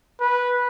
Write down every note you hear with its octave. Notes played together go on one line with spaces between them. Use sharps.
B4